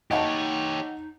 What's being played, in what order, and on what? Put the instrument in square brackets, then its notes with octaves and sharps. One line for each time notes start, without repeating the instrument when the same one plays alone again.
[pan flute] D#4 [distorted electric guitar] G4 C#5 [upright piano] D#5 F#5 A5